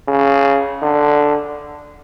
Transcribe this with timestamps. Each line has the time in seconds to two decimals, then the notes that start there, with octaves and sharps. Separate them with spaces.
0.08 C#3
0.82 D3